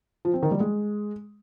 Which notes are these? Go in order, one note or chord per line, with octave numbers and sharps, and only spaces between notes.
F3
C4
D#3
G3
G#3